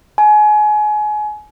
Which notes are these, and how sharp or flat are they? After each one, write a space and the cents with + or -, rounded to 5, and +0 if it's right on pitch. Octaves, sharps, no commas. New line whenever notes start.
G#5 +30